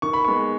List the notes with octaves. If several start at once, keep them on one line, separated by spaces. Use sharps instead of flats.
D#3 C#6
B5
G#3 B3 C#6